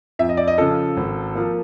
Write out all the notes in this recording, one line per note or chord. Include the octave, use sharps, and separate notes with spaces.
F2 E5
D#5
D5
D#5
C#3 F3 A4
G#1
F3 A#3